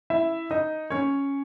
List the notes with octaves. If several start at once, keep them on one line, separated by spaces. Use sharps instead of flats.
E4 E5
D#4 D#5
C#4 C#5